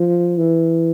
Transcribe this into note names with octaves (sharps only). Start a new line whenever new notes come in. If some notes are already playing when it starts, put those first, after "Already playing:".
Already playing: F3
E3